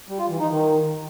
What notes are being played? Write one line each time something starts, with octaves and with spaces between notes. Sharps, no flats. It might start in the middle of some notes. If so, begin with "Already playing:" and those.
G3
F4
E3
D#4
D#3